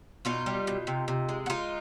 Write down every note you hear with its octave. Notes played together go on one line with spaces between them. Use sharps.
B2 D#4 F4
G3
B2
C3
C3
G#3
F#4
G#3 D#4 F4